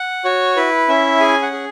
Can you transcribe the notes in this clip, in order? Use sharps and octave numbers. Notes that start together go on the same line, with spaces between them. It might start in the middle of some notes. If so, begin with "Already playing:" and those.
Already playing: F#5
F#4 C#5
E4 B4
C#4 E5
G#4 G#5
F#5
G#4